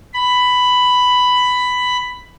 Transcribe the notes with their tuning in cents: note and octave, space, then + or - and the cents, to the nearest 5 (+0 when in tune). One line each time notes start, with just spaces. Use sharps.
B5 +10